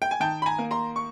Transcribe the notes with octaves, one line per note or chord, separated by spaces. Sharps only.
G5
G#5
D#3 G5 A5
B5
G#5 A#5
A#3
A#5 C6
C#6